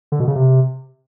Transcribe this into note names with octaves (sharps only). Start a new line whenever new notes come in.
D3
B2
C#3
C3